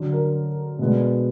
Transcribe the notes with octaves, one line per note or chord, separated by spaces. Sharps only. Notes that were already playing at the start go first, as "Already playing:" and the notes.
Already playing: D3 F#3 D4
A#4
B2 G#3 B3 D4